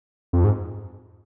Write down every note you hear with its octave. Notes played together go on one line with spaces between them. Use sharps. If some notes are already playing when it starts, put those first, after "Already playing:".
F2
G#2